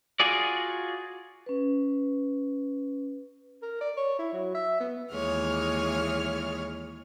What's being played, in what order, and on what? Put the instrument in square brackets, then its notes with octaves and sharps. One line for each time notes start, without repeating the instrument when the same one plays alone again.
[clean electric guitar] F4 F#4 G#4 D5
[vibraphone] C#4 B4
[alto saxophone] A#4
D5
C#5
E4
F#3
E5
B3
[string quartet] D#2 E3 G#3 C#5 F6